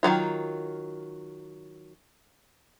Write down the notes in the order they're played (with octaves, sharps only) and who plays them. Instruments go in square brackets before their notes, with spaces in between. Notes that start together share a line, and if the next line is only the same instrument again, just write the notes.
[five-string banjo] D#3 E3 F#3 F4